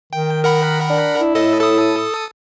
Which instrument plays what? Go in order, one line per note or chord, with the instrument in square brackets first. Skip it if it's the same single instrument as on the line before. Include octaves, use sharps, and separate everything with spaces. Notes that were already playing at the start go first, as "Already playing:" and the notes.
[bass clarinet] D#3 [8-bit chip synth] G5
[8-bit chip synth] A#4 F#5 B5
[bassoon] D4
[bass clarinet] E4
[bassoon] A2 [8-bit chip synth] A4 D#5
[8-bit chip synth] A4 D#6